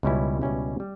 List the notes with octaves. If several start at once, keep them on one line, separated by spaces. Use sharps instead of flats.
C#2 B2 G3 C#4 E4
C#2 B2 G3 C#4 E4
G3